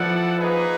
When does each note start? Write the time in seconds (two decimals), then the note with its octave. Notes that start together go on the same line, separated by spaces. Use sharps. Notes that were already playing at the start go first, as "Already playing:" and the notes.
Already playing: F3 B3 E4 A4 D5 F#5
0.39 A#3 D#4 G#4 B4